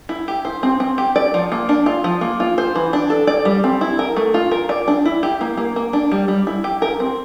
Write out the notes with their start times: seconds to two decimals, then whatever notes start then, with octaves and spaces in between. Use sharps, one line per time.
0.09 E4
0.28 G4
0.45 C5
0.63 C4
0.80 C4
0.98 G4
1.16 D5
1.34 F3
1.52 A#3
1.69 D4
1.86 F4
2.04 F3
2.21 A#3
2.40 F4
2.58 C5
2.76 E3
2.93 D4
3.10 A4
3.27 D5
3.45 G3
3.64 C4
3.81 E4
3.99 A#4
4.16 A3
4.34 F4
4.51 A#4
4.69 D5
4.88 D4
5.05 E4
5.23 G4
5.41 A#3
5.57 A#3
5.76 A#3
5.93 D4
6.12 G3
6.28 G3
6.47 E4
6.64 G4
6.82 A#4
7.00 C4